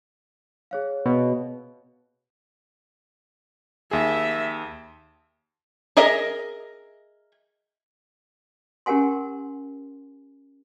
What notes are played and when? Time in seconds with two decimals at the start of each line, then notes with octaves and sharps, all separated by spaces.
0.71 G#4 C#5 F5
1.06 B2
3.91 D#2 G#4 E5
5.97 G#4 A#4 D#5 E5
8.86 C#4 G4 A#4 F#5 G#5 C6